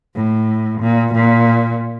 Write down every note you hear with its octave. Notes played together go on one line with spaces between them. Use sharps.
A2
A#2
A#2